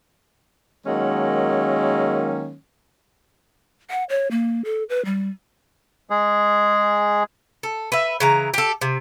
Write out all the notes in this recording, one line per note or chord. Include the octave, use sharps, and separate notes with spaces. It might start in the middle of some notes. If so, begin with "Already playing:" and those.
D#3 F#3 G#3 A#3 C#4
F#5
C#5
A#3
A4
B4
G3
G#3 G#4
A4
B4 E5
C#3 E3 A#5
G4 A4
C3